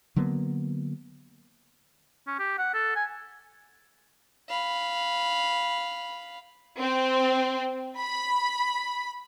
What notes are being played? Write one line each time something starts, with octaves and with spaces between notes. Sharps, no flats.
D3 F#3 A#3 B3
C#4
G4
F#5
A4
G#5
F5 B5
C4
B5